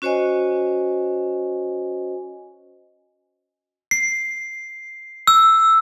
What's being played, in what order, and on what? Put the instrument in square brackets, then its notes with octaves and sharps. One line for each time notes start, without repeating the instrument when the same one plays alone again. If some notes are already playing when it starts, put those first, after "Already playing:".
[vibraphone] C#4 F#4 C5 C#5 D#5 G#5
[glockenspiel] C7
E6